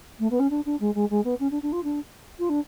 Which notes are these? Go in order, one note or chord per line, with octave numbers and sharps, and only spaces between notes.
A3
B3
C#4
D4
D4
G#3
G#3
G#3
B3
C#4
D4
D4
F4
D4
F4
D4